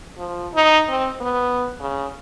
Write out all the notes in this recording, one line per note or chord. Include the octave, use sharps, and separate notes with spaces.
F3
D#4
C4
B3
C#3